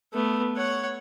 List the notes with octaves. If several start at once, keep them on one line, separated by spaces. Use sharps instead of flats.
A3 B3
C#5 F#5